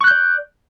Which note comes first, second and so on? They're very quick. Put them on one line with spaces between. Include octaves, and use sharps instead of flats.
C#6 F#6 G6 D5